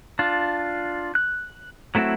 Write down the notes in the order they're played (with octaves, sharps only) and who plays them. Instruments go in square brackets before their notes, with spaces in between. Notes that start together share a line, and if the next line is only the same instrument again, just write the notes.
[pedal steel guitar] D4 F4
F#6
F#3 A3 C4 E4 F#4